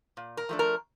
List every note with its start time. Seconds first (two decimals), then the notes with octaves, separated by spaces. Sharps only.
0.17 A#2
0.37 A#4
0.49 F3 A3 D4
0.59 A#4